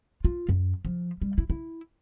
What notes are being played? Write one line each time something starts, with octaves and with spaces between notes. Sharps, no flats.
F4
F#2
F3
G3
E4
E4